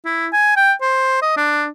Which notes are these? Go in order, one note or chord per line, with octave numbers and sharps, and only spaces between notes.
E4
G#5
G5
C5
D#5
D4